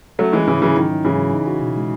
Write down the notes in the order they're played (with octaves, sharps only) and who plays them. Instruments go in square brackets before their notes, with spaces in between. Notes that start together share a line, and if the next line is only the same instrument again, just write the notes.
[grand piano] F#3 A3 [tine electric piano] C#4
[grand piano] E3 G#3 [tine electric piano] E4
[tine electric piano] G#2 [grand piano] C#3 E3
[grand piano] C#3 E3 [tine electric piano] F#3
[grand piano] D#3 [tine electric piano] C#4
[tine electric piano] E4
[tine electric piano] G#2 [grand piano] C#3 E3
[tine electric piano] F#3
D#4
F#4
B2
G#3